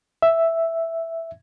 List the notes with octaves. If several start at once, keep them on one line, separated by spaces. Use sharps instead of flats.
E5